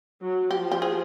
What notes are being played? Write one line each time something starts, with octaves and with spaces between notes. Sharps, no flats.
F#3
F3 G4
G4
G#4